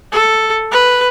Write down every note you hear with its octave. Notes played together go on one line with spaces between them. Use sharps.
A4
B4